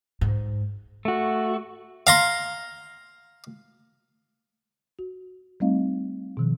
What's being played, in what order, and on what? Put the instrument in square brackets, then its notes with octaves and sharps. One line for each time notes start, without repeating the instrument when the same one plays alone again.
[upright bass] G#2
[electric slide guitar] A3 F#4
[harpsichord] F5 A#5 C6
[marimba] F#4
G3 A3 C4 D#4 D#5 F5
B2 D#3 F3